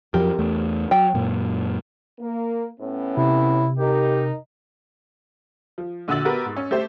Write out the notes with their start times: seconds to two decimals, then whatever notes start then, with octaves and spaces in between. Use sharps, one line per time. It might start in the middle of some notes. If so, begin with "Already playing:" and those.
0.14 F2 F3 F#3 G4 A#4
0.39 E2 A3
0.91 F#3 G5
1.14 F#2 A#2
2.20 A#3
2.80 A2 B3 C#4
3.17 C3 E4
3.78 D#4 G4 A#4
5.78 F3
6.08 A#1 D3 F#4 E6 A6 F#7
6.25 B3 F#4 G4 A#4 B4
6.45 G#2
6.56 C#4
6.71 A3 G4 C5